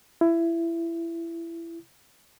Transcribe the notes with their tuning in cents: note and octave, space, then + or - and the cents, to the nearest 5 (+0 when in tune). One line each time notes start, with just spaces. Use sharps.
E4 +20